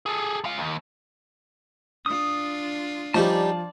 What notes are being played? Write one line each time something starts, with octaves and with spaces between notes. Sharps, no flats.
G#4 A4
G#3 F5
D#2
D4 F4 D#6
F3 G3 C#4 D#4 D5 A5